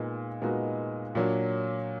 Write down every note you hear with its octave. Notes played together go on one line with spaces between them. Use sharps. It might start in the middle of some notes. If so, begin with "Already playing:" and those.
Already playing: A#2 G#3 B3 D#4
A#2 G#3 B3 D#4 F#4
A#2 F#3 D4 F#4